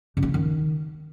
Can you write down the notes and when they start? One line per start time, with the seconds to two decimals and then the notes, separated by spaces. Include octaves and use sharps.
0.17 C#3
0.23 A#3
0.28 E4
0.34 D#3